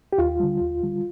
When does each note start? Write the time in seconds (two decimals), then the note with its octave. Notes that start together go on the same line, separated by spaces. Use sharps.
0.13 G4
0.18 D#2 F4
0.40 D3 G3
0.61 D#2
0.83 D3 G3